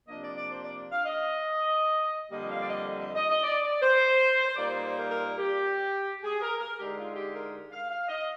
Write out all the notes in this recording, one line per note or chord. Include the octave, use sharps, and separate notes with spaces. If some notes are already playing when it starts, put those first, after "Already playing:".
C3 F3 A#3 D4 D#5
D5
D5
C5
D5
F5
D#5
F2 D3 G3 A#3 D#5
F5
D5
D#5
D#5
D#5
D#5
D5
D5
C5
C5
A#2 G3 A#3 D#4 D5
C5
C5
A#4
A#4
G4
G#4
A#4
A#4
D3 G#3 D#4 G4
F4
G4
A#4
F5
F5
D#5